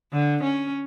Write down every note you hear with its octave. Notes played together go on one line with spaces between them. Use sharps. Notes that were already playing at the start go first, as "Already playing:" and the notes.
D3
C#4